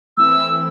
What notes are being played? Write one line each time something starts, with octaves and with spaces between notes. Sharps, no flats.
E3 A3 C4 E4 E6